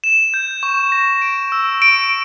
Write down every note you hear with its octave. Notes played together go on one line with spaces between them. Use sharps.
E7
G6
C#6
A#6
D7
E6
D7